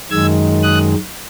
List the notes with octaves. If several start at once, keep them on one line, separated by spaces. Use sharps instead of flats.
F#2 D#3 G#3 E6 G#6
D#6 F#6